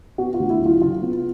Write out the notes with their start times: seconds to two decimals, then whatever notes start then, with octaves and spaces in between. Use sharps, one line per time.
0.18 B3 F#4
0.34 F4
0.39 D2
0.50 E4
0.60 F#3
0.66 F4
0.81 C#3 F4
1.02 B3